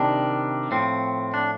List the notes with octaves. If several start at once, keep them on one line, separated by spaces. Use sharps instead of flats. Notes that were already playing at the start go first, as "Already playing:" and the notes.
Already playing: C3 D#3 G3 D4
A2 F3 C4
D4